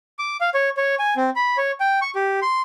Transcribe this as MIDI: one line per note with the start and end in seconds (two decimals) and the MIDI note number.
0.19 0.37 86
0.41 0.50 77
0.54 0.69 73
0.77 0.95 73
0.99 1.14 80
1.17 1.30 60
1.36 1.57 83
1.57 1.71 73
1.80 2.00 79
2.02 2.11 85
2.15 2.40 67
2.42 2.62 84